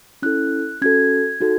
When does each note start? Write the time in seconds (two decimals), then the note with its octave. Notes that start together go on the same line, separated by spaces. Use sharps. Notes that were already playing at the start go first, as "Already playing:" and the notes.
0.22 C#4 E4 A4 F#6
0.82 C#4 F#4 A4 G#6
1.40 D#4 F#4 A4